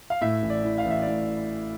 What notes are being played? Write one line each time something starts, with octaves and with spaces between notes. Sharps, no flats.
F5
A2 E5
A1
D5
E3
F5
A1
E5
A2 D5